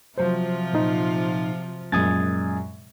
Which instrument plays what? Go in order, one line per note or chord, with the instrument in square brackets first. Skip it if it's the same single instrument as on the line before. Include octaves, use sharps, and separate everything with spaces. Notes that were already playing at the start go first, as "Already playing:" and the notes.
[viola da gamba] C3 F3 F4 [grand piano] F#3 C5
[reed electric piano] A#2 D#4
[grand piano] F#2 A#2 G#3 [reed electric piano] D#6 G#6 A6